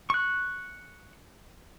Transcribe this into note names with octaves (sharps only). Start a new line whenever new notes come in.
C#6 F#6